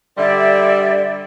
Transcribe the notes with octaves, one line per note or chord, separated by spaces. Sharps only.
D3 G3 D5 E5